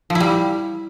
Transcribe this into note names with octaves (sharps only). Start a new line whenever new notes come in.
F3
E4
G3